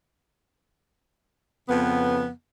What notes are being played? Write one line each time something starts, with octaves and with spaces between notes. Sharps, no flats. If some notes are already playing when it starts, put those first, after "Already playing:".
F2 C#3 B3